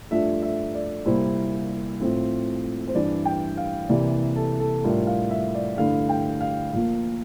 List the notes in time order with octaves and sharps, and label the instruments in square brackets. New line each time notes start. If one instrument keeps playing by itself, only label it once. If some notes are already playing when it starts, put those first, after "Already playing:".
[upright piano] G2 F3 A3 D4 F4 E5
E5
D5
C2 A#2 G3 A#3 E4 C5
A2 F3 C4 F4
C5
G2 E3 G3 D4 D5
G5
F5
C2 C3 E3 A#3 D5
A4
A4
A2 G3 D4 F4 A#4
F5
E5
D5
G2 D3 A3 E4 F5
G5
F5
A#2 F3 A#3